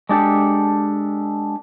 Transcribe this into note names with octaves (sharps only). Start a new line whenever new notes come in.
G#3 D4 G4 A4